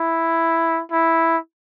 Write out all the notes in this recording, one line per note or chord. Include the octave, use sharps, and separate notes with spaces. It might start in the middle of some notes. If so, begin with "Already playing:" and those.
Already playing: E4
E4